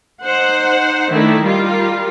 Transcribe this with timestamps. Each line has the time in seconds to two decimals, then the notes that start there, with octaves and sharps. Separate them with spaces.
0.24 D#4 C5 F#5
1.10 D#3 A3 D4 E4
1.44 G3 F4 A#4